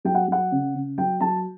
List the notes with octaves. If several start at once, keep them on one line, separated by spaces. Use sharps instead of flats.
F#3 G5
F#5
F#3 F#5
C#3
C#3
F#3 G5
F#3 A5